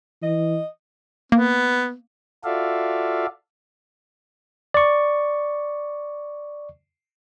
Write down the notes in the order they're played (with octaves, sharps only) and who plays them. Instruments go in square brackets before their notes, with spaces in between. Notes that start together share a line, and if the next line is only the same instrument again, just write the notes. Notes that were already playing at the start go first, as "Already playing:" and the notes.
[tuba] E3 [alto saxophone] D#5
[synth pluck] A#3 [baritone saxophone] B3
[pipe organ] F4 F#4 A4 D5 E5 F5
[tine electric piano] D5 C#6